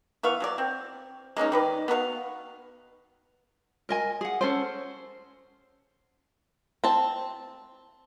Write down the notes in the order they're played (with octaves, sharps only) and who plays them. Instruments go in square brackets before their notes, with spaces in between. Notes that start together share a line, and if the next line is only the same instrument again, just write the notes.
[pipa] E3 B3 F5 C#6
F#3 G#4 D5
C4
G#3 A#3 C#4 D#4
D#3 B4 D5
B3 F#4 A#4 F5
[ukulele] A#4 D#5 G#5
G#4 F#5
C#4 A4 C5
[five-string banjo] C4 A5